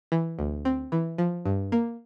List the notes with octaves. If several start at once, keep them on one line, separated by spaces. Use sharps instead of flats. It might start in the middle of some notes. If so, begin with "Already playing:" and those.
E3
D2
C4
E3
F3
G2
A#3